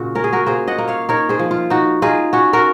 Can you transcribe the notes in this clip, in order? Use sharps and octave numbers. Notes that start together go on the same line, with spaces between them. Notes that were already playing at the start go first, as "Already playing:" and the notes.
Already playing: A#2 C#3 F#4
C#4 A#4
G#4
F#4 A#4
A#3 G#4 C5
D#5 F#5
A#3
C#5 F5
D#4 A#4 C#5
G#4 C5
F3
F4
D#4 F#4
D#4 F4 G#4
C#4 F#4
F#4 A#4